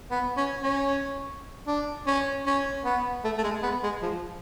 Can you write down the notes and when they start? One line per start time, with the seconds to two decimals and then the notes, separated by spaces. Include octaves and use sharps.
0.11 B3
0.37 C#4
0.63 C#4
1.67 D4
2.07 C#4
2.46 C#4
2.85 B3
3.24 A3
3.38 A3
3.44 G#3
3.63 B3
3.83 G#3
4.02 F3